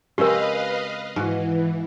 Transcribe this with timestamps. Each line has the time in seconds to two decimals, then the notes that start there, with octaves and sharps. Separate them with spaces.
0.18 C#3 G#3 C4 G4 A#4 B4 D#5 F5
1.16 G#2 E3 F#4